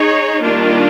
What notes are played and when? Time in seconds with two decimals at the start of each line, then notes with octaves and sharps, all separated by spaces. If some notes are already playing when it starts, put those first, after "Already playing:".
Already playing: D#4 G#4 C#5
0.42 D#3 G3 A#3 D4 F4